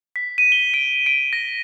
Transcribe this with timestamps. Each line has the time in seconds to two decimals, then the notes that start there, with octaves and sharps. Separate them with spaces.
0.16 B6
0.38 D#7
0.52 G7
0.74 D7
1.06 D7
1.33 A#6